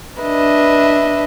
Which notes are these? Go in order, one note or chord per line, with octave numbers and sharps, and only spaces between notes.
D4 B4 D#5 E5